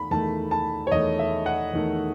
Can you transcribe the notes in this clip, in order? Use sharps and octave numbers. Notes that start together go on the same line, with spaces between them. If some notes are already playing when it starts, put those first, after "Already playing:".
Already playing: E2 D#3 A3 B5
E2 D#3 A3 A5
A5
C#5
E2 D#3 A3 D#5
E5
F#5
E2 D#3 A3